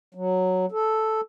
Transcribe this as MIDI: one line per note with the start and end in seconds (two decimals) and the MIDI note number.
0.15 0.66 54
0.72 1.21 69